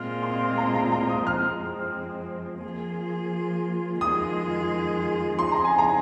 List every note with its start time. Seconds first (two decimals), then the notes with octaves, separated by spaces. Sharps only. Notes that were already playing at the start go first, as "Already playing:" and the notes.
Already playing: A#2 G#3 C4 F4 F6
0.23 C6
0.58 A#5
0.75 A#5
0.92 A#5
1.09 D#6
1.26 F2 F3 G#3 C4 F6
2.64 F3 A#3 F4 G#4
4.01 F2 D#3 G#3 F4 G#4 D#6
5.38 F3 C4 D#4 G#4 C6
5.52 A#5
5.65 G#5
5.78 A#5